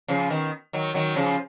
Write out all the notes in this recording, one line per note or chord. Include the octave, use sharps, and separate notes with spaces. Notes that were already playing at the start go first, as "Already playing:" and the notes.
C#3 F3
B2 D#3
D#3 F#3
D#3 F#3
C#3 F3